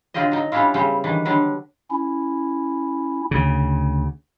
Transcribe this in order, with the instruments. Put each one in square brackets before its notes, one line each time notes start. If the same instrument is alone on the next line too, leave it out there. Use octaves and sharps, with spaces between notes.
[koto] D3 F#3 F4 G4 D#5
F#3 D#4
G3 C#4 D4 E4 F4
C#3 F#3 G3 B3 C#4 C5
D#3 E3 D4
D3 F#3 G3 D4
[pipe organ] C#4 E4
[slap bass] D2 C#3